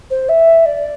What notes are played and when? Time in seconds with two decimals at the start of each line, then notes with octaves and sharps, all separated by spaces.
0.10 C5
0.29 E5
0.65 D5